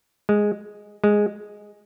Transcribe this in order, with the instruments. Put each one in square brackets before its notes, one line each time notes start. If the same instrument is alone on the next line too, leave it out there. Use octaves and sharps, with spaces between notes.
[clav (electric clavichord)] G#3
G#3